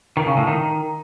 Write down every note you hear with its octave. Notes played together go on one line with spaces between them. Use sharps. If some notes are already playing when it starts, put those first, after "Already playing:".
D#3
C#3
A2
D#3